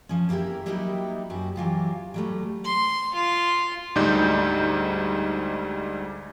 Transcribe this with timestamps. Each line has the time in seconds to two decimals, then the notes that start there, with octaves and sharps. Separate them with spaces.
0.09 F3 C#4
0.29 A#3 E4 F4 G4 A#4
0.66 F#3 G3 A#3 D#4 E4 G4
1.30 F#2 F#4 G4
1.56 E3 F#3 F4 G4
2.14 F#3 G3 A3
2.64 C6
3.14 F4
3.95 D2 G#2 G3 D#4 G6